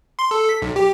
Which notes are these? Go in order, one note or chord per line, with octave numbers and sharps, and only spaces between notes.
C6
A4
B6
B1
G4